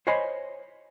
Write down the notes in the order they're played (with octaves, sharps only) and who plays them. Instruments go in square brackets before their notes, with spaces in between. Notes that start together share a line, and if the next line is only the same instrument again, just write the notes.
[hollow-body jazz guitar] C5 C#5 D#5 G#5 B5 C6